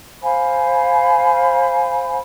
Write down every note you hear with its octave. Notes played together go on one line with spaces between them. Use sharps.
C5 F5 G#5 B5